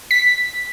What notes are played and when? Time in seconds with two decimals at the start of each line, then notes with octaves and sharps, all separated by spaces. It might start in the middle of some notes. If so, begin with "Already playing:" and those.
0.11 B6